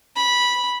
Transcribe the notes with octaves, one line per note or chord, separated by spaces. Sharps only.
B5